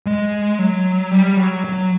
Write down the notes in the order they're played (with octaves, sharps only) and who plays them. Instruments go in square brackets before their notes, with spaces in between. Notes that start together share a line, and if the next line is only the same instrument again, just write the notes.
[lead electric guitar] G#3
F#3
G3
F#3
F#3